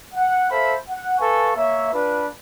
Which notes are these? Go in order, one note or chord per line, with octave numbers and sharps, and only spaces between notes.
F#5
A4 C5 E5 F5 B5
F#5
A4 B4 F5 G#5 C#6
A#3 C#5 E5
D4 F4 B4